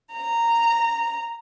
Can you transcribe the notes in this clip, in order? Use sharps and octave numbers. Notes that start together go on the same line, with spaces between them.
A#5